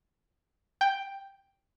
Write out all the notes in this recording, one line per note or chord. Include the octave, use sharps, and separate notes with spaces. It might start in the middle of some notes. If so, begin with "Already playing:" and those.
G5